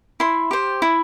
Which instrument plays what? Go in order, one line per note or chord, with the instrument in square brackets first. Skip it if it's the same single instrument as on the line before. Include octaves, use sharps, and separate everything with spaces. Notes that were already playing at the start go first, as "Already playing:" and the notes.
[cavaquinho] E4 C6
G4 C5
E4